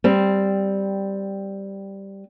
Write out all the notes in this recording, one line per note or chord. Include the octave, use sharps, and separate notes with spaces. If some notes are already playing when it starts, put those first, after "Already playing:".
G3 C4